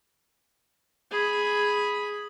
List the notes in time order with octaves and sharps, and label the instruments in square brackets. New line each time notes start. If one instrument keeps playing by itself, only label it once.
[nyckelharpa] G#4 B5